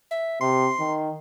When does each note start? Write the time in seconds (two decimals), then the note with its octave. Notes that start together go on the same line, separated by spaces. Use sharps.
0.11 E5
0.41 C3 C6
0.80 D#3